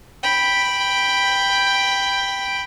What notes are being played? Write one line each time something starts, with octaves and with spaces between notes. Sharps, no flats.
G5 B5